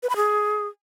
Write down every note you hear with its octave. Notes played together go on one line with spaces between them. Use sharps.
B4
B5
G#4